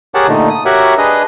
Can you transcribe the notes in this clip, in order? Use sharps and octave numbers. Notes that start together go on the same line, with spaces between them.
G4 G#4 A#4 C#5 F#5 A5
A#2 D3 A3 D#4
D#6
F#4 G4 A#4 C#5 E5 F#5
D4 G#4 B4 D#5